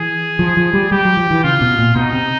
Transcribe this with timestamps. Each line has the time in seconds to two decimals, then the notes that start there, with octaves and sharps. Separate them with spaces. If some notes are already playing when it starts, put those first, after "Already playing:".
Already playing: E3 G#4
0.39 F3
0.57 F3
0.73 G3
0.92 G3 G4
1.05 F#3
1.17 F3
1.31 E3
1.44 C#3 F4
1.61 B2
1.79 A#2
1.96 B2 D#4
2.13 C3